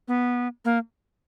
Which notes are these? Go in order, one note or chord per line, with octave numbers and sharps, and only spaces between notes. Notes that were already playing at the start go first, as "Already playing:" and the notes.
B3
A#3